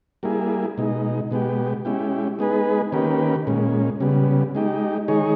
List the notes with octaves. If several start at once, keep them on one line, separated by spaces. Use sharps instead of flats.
G3 A#3 E4 G#4
B2 G#3 D#4
B2 G#3 B3 G4
G#3 C#4 E4 G4
G#3 B3 D#4 G#4 B4
D#3 A#3 C#4 G4 B4
A#2 G#3 C#4
C#3 G3 B3
G#3 D#4 G4
D#3 G#3 D#4 G#4 C#5